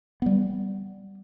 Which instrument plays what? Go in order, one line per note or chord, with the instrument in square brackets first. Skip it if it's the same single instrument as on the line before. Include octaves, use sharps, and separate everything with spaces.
[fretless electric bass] G3 B3